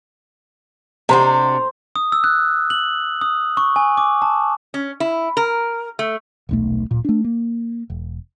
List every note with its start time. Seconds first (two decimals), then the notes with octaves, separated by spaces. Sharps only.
1.09 C3 D4 F#4 C5 A#5
1.96 D#6
2.12 E6
2.24 F#6
2.70 F#7
3.21 D#6
3.57 C#6
3.76 G#5
3.97 D6
4.22 A5
4.74 C#4
5.00 E4
5.37 A#4
5.99 A3
6.49 D#1 B1 A3
6.91 D1 A#2
7.05 A3 D4
7.24 A#3
7.90 E1